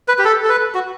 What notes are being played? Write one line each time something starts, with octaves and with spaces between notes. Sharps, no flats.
B4
G4
A4
A4
B4
F#4